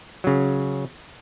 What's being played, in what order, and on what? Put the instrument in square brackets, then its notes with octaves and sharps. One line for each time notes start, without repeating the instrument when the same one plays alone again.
[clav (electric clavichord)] C#3 F#3